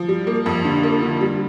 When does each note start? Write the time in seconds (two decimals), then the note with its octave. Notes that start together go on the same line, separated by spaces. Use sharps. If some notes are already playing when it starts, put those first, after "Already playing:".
Already playing: F3
0.09 G3
0.27 A#3
0.46 F2
0.65 D3
0.83 A#3
1.02 D3
1.21 G3